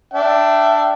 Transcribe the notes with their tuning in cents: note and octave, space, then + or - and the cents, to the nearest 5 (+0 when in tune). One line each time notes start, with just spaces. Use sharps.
D4 +5 E5 +15 G5 -25